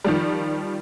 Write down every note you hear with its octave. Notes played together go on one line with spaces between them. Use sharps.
D#3 F3 G3